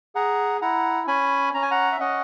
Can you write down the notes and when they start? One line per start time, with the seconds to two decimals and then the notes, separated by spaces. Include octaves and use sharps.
0.15 G#4 F#5 A#5
0.62 E4 F#5 A#5
1.07 C#4 G#5 B5
1.54 C#4 A#5
1.62 G#5
1.71 F#5 A#5
1.92 E5
2.00 C#4 D#5 F#5